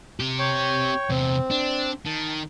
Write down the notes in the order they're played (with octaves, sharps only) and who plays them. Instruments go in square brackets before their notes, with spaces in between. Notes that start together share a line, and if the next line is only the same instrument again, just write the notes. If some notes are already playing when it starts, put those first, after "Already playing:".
[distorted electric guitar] C4 G4
[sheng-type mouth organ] C#5 G5 C#6
[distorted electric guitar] E2 C3 [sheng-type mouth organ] C4
[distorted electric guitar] D4
[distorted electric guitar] D#3 [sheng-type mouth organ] A5